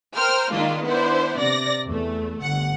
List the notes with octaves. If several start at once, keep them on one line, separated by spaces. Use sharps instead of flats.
A#4 C5 G5 F6
D#3 G#3 A#3 D4 F4
B3 D4 E4 C5
C3 D5 A#6
E2 A3
G1 F#5